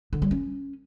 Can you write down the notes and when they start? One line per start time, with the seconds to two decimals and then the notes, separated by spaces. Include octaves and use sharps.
0.13 D3
0.22 G3
0.31 C#4